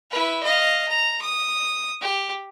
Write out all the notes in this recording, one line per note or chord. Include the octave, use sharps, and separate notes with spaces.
E4 B4
D#5 F5
A#5
D#6
G4